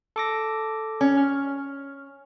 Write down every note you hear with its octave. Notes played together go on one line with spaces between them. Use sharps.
A4 D6 A#6
C#4
F6